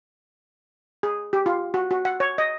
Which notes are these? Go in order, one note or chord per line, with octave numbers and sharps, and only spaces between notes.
G#4
G4
F4
F#4
F#4
F#5
C#5
D#5